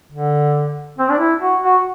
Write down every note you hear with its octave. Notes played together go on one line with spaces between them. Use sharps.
D3
C4
D4
E4
F#4
F#4